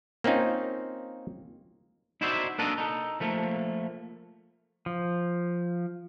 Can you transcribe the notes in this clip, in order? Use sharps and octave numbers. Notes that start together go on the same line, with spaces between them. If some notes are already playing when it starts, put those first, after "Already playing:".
A#3 C4 C#4 D#4 F4
D#4 E4 F#4 C5 D5 E5
A#3 B3 D4 F#4 A4 D#5
D#4 A4
F3 A3 A#3
F3